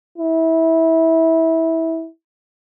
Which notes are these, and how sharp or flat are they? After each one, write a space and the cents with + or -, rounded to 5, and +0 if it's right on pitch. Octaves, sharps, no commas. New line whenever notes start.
E4 -20